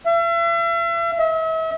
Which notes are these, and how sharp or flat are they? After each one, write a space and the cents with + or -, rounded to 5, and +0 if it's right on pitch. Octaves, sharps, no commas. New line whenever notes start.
E5 +40
E5 -40